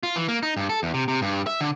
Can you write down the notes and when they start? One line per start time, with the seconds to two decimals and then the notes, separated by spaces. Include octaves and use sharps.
0.03 F4
0.16 E3
0.28 A#3
0.43 D#4
0.57 G2
0.69 A4
0.83 E2
0.94 C3
1.08 C3
1.22 G2
1.47 E5
1.61 D3